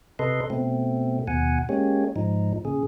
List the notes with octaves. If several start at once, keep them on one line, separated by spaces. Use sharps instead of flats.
C3 A4 B4 D#5 C6
B2 A3 C4
D#2 B2 F#5 G#5
G#3 A#3 C#4 G4 C#5
G#2 F3 D#4
A#2 C#3 G#4